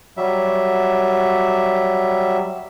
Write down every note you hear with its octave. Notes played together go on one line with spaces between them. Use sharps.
F#3 G3 E5